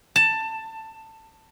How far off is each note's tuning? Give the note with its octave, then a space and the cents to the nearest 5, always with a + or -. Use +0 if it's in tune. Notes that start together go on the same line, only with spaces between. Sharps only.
A5 +15